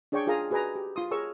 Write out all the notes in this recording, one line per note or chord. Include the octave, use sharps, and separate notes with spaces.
D4 G#4 C#5 D5 G5 C#6
F4 G#4 A#4 F5 A#5 D#6
F#4 G#4 B4 D5 G#5 A#5
G4
F4 C6 D#6
G#4 A#4 C#5 C#6 E6